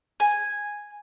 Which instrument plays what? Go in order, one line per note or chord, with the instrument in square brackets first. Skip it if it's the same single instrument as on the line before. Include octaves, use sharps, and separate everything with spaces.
[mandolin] G#5